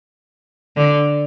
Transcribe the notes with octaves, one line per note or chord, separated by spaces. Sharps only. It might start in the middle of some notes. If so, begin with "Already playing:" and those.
D3